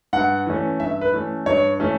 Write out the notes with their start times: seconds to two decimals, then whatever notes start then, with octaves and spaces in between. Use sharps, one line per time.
0.13 G2 F#5
0.46 E3 A3 C#4
0.80 G2 E5
1.01 B4
1.13 E3 A3 C#4
1.46 G2 C#5
1.80 E3 A3 C#4